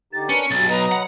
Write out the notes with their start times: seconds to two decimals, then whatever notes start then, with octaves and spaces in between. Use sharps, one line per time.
0.13 D3 D#4 G4 A6
0.29 C#4 D4 A#4 B4 C#7
0.51 B1 G2 B2 A6
0.70 F#3 B4 D#5 A#5
0.92 F#5